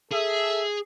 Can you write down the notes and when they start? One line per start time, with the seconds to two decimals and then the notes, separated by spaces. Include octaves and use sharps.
0.12 G#4 A4 E5